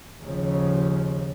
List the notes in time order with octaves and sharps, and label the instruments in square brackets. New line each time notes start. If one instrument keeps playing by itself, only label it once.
[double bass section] D#2 C#3 F3